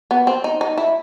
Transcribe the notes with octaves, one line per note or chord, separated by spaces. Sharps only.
B3
C4
D#4
D#4
E4